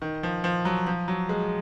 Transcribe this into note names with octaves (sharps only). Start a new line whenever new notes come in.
D#3
F3
F3
F#3
F3
F#3
G#3